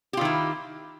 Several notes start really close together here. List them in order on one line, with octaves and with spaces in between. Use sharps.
G4 F4 D#3 E4